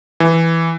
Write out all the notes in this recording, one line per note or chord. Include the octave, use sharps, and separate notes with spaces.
E3